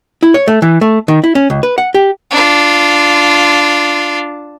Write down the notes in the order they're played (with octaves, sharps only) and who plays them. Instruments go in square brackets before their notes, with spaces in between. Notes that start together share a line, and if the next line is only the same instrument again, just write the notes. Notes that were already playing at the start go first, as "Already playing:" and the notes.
[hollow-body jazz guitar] E4
C#5
A3
E3
A3
D#3
E4
C#4
C#2
B4
F#5
G4
[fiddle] D4 F4